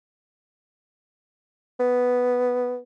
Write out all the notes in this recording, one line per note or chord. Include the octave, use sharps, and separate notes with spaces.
B3